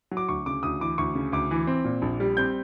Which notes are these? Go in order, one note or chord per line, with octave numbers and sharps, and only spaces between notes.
F#3
D6
D2 C#6
C#3 D6
D2 D#6
E3 D6
D2 C#6
C#3
D2 D6
E3
C4
A#2
A#1
G3
C4 G6